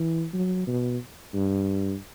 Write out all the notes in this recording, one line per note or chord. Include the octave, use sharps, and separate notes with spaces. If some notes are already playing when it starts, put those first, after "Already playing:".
Already playing: E3
F#3
B2
G2